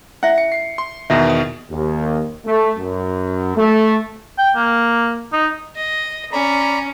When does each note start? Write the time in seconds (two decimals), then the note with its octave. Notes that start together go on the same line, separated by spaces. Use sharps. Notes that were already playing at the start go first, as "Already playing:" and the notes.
0.23 C#4 E4 E5 F#5
0.38 C#7
0.52 C7
0.78 C6
1.10 E2 B2 D#3 E5
1.30 D#6
1.70 D#2
2.46 A3
2.78 F#2
3.57 A3
4.38 G5
4.55 A#3
5.33 D#4
5.76 D#5
6.32 C#4 D5 A#5 B5